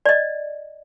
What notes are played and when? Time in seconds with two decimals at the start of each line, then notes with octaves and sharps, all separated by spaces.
0.06 D5 D#5